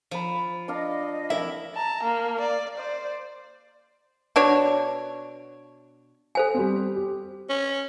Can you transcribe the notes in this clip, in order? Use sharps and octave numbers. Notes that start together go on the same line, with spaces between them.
F3 F5 B5
D4 D5 D#5 F5
F2 E4 A#4 E5
A5 A#5
A#3
D5
C5 D5
B2 D4 C#5
A4 C5 G#5
G3 C4
G4
C#4